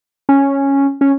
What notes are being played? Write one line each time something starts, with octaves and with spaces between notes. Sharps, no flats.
C#4
C#4